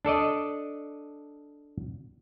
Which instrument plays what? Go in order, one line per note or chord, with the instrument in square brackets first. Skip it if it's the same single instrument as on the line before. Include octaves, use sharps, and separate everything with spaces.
[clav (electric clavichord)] D4 A4 D5 D#5